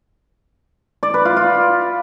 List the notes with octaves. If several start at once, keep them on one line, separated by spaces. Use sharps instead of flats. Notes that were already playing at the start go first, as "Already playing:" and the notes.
D5
B4
F4
F4